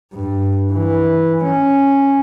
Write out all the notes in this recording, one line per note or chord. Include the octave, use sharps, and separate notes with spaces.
G2
E3
C#4